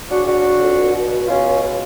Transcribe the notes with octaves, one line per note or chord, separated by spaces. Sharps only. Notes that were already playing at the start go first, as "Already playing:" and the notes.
C#3 D4 F#4
C#3 D4 F#4
C#3
F2
C#2
B2
C#2
B2 C#4 F4
C#2
B2